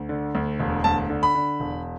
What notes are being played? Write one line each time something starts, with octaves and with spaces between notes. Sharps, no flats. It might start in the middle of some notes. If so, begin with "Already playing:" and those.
Already playing: D2
D3
D2
E1
D2 A5
D3
B5
D3
E1